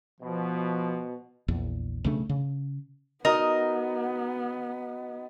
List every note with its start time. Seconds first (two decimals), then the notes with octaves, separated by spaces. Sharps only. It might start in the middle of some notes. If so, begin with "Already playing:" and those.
0.20 B2 F3
1.48 A#1 E2
2.04 B1 C#3 A3 D4
2.29 C#3
3.25 B3 D#4 F#4 A#4 D#5